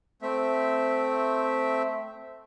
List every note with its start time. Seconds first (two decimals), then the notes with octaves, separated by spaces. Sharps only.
0.22 A3 C4 E5